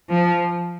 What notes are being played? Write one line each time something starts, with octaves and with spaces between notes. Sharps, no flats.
F3